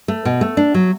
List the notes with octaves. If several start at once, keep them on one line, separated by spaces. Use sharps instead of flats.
A3
B2
A3
D4
F#3